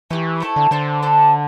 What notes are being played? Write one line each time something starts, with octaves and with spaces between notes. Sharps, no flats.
E3 A3 E4 G4
A3 C4 E4 A4
D3
D3 C4 A4 C5
D4 A4 C5